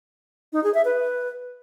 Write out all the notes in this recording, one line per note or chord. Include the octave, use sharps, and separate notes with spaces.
D#4
G#4
E5
B4